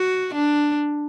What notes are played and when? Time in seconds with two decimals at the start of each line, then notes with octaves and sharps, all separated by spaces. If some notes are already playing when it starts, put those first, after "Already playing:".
Already playing: F#4
0.34 D4